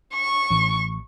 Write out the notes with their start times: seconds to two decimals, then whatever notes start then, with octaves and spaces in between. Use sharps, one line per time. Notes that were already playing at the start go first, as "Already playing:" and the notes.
0.14 C#6
0.51 A1